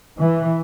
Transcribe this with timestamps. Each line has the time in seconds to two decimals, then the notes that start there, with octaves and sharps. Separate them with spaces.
0.19 E3